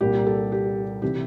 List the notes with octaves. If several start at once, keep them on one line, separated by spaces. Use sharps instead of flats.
C2 A#2 G3 A#3 G4
A4
G4
C3 E3 G4